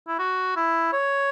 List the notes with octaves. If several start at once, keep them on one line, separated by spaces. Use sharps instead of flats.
E4
F#4
E4
C#5